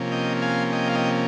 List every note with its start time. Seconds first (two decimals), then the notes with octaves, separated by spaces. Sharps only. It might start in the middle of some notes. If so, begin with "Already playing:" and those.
Already playing: C3 F3 A#3 C#4
0.12 D#5 G5
0.42 F5 G#5
0.72 D#5 G5
0.89 F5
0.95 D#5 G5